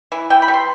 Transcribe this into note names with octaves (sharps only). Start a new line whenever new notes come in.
E3
E3 G5
B5
G3
C6